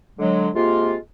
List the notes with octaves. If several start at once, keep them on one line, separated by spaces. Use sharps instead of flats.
D3 F#3 G#3
C3 G#3 A#3 F4